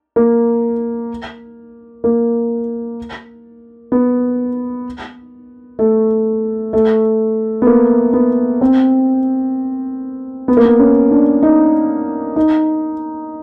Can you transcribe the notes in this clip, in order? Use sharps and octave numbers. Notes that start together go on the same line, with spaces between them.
A#3
A#3
B3
A3
A3
B3
A#3
B3
C4
B3
A#3
B3
C#4
D4
D#4
D#4